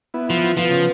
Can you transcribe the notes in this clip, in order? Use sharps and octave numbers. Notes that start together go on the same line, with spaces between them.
B3 E4
F3
F3 B3 F5
C#3